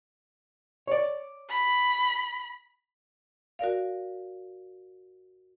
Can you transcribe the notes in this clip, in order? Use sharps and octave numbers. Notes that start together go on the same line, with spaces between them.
C#5 D5
B5
F#4 A#4 D5 F5